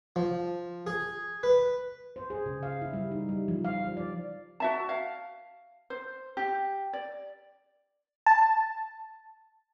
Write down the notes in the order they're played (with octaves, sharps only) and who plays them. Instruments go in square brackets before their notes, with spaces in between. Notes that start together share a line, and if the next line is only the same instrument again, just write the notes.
[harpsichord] F3
G#4
B4
[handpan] C5
G#4
C#3
F5
E4
G3
D#4
G3
F3
F5
F3
D5
[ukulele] F#4 E5 A5
F5
C5
G4
D5
[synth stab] A5